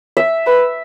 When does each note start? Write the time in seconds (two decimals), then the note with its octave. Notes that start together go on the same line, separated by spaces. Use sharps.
0.17 E5
0.46 B4